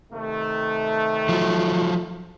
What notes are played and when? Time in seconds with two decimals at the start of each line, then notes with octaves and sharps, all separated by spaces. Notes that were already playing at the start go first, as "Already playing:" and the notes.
0.12 C3 D#3 A3
1.29 F3 F#3